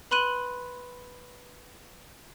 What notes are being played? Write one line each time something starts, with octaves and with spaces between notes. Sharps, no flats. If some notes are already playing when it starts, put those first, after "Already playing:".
B4 B5 C6 F#6 D#7 F#7